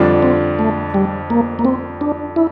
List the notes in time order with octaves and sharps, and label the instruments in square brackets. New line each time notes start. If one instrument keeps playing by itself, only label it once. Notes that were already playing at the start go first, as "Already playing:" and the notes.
Already playing: [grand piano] F2 D3 G3 D4 F4
[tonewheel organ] C4
A3
G3
A#3
A#3
C4
D4
E4